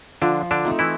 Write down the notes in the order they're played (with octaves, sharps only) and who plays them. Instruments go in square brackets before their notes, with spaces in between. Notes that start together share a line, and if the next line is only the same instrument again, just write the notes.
[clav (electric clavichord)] D3 D4 [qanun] F3
[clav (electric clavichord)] D3 D4
[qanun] A3 C4 D#4
[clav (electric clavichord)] E3 E4